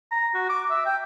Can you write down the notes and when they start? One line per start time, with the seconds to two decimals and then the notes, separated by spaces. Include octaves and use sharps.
0.11 A#5
0.34 F#4
0.49 D6
0.70 E5
0.86 G5